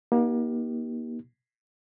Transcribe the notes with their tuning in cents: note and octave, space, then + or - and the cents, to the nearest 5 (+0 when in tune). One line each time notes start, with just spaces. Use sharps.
A#3 +35 D#4 +20 G4 -20